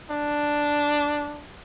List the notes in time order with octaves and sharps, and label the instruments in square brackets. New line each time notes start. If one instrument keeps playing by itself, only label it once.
[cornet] D4